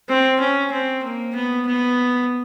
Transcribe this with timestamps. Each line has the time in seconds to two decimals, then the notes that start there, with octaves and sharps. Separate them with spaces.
0.09 C4
0.40 C#4
0.72 C4
1.04 A#3
1.35 B3
1.67 B3